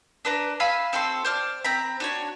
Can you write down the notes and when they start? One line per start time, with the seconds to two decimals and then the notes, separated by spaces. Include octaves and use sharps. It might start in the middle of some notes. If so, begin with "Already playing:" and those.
0.25 D4 B4 A#5
0.60 E5 F5 G#5 B5
0.93 C4 F#4 A4 C6
1.25 C5 D5 F6
1.64 C4 A#5 B5
2.00 D4 F#4 C#5